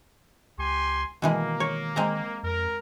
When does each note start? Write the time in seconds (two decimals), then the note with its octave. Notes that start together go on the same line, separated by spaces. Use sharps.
0.58 C#2 G4 G#5 C6
1.22 B2 D#3 E3 G#3 A#3
1.60 C#5
1.96 G#3 C4 A#5
2.43 F2 A#4